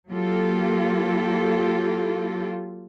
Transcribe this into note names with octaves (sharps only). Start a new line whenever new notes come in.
F#3 A#3 F4 G4 A4